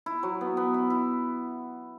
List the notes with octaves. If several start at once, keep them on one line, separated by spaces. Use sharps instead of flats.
E4
F#3
B3
B3
E4
E4